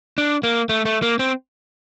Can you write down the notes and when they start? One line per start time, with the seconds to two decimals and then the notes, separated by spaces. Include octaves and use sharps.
0.18 D4
0.43 A#3
0.69 A3
0.85 A3
1.02 A#3
1.19 C4